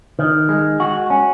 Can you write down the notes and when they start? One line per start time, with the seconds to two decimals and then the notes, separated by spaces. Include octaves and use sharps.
0.19 D#3
0.49 G#3
0.80 F#4
1.10 C#4